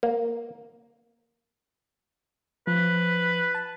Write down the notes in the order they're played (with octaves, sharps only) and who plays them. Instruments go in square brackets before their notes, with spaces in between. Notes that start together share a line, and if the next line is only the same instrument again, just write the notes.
[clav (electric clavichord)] A#3
[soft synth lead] F3 [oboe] B4
[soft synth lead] A5